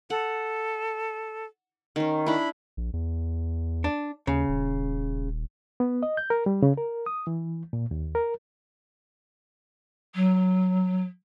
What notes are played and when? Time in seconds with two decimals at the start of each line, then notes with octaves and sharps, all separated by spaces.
0.10 A4 F#5
1.96 D#3 C#4
2.26 D4 E4 B5
2.77 A#1
2.93 E2
3.84 D4
4.27 D#2 C#3
4.49 D#1
5.80 B3
6.03 D#5
6.17 G6
6.30 A#4
6.46 G3
6.63 C#3
6.77 A#4
7.06 D#6
7.27 E3
7.73 A#2
7.91 D#2
8.15 A#4
10.15 F#3